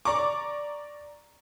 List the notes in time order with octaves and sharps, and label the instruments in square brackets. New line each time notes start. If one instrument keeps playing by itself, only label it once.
[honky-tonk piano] D5 A#5 C#6 D6